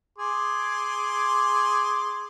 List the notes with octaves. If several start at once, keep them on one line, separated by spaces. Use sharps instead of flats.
G#4 C6 D6